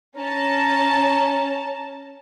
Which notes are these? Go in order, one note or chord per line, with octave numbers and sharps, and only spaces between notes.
C#4 A5 A#5